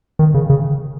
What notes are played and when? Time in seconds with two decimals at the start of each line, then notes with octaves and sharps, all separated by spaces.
0.19 D#3
0.34 C#3
0.50 C#3